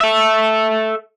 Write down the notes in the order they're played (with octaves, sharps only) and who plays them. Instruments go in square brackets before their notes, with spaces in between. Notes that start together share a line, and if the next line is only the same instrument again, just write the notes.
[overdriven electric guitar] A4 E5